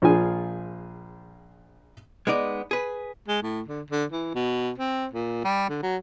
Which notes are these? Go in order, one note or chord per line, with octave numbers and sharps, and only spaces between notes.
A#1 F3 F4 G#4 G#5
G#3 B3 D#4 D5
G#4 B4
G#3
A2
D3
D3
E3
B2
C4
A#2
G3
D3
F#3